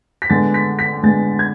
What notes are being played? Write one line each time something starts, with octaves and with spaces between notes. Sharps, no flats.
B6
D3 G#3 B3 A6
B6
B6
D3 G#3 B3 A6
G#6